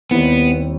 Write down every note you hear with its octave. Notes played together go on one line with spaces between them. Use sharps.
D#2 D#3 G3 B3 C4 E4